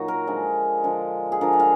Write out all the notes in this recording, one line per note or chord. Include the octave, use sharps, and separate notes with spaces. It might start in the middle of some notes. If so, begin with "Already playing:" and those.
Already playing: A#2 F#3 D#4 F#4
A#4
D3 F3 G#3
D3 F3 G#3
G#4
D3 F3 G#3 A#4
F#5
F5